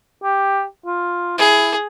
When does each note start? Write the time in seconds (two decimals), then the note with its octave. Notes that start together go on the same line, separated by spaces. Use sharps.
0.23 G4
0.86 F4
1.38 E4 G#4